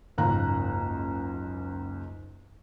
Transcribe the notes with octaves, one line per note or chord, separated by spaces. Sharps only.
F#1 C#2 G#2 A#5 F#6